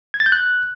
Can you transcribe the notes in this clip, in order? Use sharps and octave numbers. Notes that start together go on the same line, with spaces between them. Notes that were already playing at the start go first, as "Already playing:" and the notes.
G#6
A6
G6
F#6